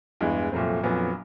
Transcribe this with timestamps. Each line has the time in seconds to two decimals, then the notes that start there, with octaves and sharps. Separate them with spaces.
0.21 E2 G2 E3 G#3
0.52 C2 F2 A#2 F#3 A3 C4
0.83 A#1 F2 A#2 F#3 B3